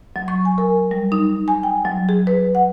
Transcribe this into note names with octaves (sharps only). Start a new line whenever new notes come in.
F#3
C#6
G#5
A#4
G3
D#4
G#5
G5
F#3
G#4
B4
F#5